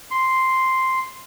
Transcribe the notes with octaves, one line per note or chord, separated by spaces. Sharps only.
C6